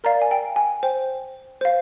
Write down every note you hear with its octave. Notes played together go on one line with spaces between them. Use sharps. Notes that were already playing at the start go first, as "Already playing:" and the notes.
A#4 D5 F5 A#5
G#5
G5
G#5
C5 G5
C5 F5